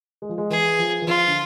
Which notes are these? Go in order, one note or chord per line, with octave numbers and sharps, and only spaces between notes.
G#3
F3
G#3
E3 G#4
F3
E3
F3 F4
D3